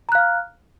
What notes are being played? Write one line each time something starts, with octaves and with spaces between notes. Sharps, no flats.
F5 A#5 F6 F#6